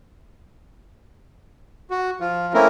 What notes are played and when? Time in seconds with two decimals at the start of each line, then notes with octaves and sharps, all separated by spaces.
1.90 F#4
2.21 F3 F4
2.54 A3 A#3 C4 C#4 E4 A#4